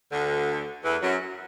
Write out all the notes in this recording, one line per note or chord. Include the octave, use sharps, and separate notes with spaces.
D2 D3
E2 E3
F#2 F#3